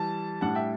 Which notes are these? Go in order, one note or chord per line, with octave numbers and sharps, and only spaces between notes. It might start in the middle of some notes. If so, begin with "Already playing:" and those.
Already playing: E3 G3 A5
A2 G3 D4 F#5 A5
E5 G5